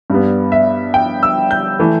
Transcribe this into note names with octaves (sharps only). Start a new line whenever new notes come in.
G2 G3 B3
E5
G5
E6
G6
E3 A3